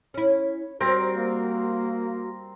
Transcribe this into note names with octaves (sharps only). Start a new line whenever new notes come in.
C#4 E4 C#5
G3 C4 F#4 A#4 C5
A#3